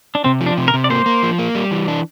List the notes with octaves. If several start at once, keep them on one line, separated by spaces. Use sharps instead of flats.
D4
C3 C4
F3
D4
C3
A#4
C3
D5
A#3 C5
A#3
F3
A#3
G3
E3
D4